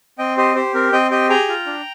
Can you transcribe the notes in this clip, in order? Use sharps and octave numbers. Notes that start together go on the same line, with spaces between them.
C4 D#5 G5
G4 C5 D#5
G4 C5
C4 A#4
C4 D#5 G5
G4 D#5 G5
G#4 G5 A#5
F4
D4